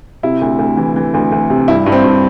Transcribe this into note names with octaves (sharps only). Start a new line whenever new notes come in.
C3 E4
D2
D2
E3
E3
D2
D2
C3
G2 E4
G2
C4
G2